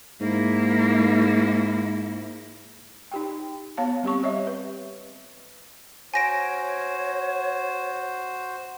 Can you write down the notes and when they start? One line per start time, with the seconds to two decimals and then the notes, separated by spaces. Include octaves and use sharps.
0.21 G#2 A#3 E4
3.12 D#4 G4 G5
3.77 B3 C#5 F5 A5
4.03 G3 C4 G4 C#6
4.23 G4 C#5 D#5 E5
4.47 B4
6.14 F#4 C5 C#5 G#5 A#6 D7